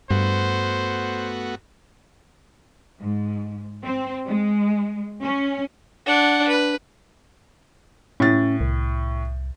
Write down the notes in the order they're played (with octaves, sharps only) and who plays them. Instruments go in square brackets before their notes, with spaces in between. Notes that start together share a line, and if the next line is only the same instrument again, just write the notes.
[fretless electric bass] G2 [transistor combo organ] A3 B3 F#4 [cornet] C5
[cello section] G#2
C4
G#3
C#4
[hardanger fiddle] D4 F#5
B4
[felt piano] A2 A6 [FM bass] C#4
[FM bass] C2